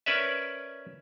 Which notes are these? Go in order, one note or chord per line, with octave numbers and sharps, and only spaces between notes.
C#4 A#4 B4 D5 E5